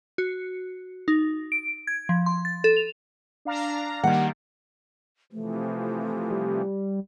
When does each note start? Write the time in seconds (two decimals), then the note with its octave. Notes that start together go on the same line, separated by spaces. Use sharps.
0.18 F#4
1.08 D#4
1.52 D7
1.87 G#6
2.09 F3
2.26 C6
2.45 A6
2.64 A4
2.77 F7
3.45 D4 F5 A#5
4.03 D#3 G3 A#3 G4 F#5
5.32 C3 E3 F3 A3
6.31 G3